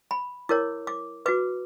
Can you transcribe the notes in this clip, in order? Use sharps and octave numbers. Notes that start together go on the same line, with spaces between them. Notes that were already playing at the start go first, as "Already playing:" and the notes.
B5
E4 A#4 C#5 D6
D6
F#4 B4 D6